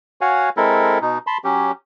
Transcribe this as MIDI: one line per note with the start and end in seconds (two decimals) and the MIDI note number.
0.21 0.49 66
0.21 0.49 73
0.21 0.49 77
0.21 0.49 78
0.21 0.49 80
0.57 0.99 56
0.57 0.99 60
0.57 0.99 64
0.57 0.99 69
0.57 0.99 70
1.02 1.18 47
1.02 1.18 63
1.27 1.38 81
1.27 1.38 83
1.27 1.38 84
1.44 1.72 54
1.44 1.72 61
1.44 1.72 67